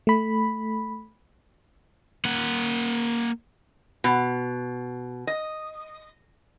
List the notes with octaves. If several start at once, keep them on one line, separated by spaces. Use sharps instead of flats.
A3 B5
A#3 F#5
B2
D#5